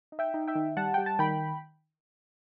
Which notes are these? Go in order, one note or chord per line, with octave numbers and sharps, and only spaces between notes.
D#4
E5 G5
D#4
E5 G5
D#3
G3 F#5 A5
G3 G5
A5
D#3 G5 B5